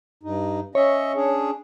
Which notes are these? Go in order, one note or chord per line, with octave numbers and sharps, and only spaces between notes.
G2 D#4
C#4 C#5 D#5 E5
C#4 D4 G#4